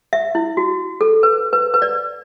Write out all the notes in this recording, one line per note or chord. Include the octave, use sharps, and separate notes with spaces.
E5
E4
F#4
A4
B4
B4
B4
D5